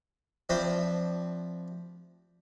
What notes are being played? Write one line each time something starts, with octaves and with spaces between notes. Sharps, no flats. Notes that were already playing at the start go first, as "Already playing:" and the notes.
F3 C4 D4 E4